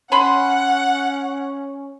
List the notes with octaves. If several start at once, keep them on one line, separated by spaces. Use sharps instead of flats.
C#4 F#5 G#5 B5 C6